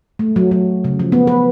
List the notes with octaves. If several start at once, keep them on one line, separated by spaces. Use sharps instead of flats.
A3
F#3
F#3
C#3
F3
B3
B4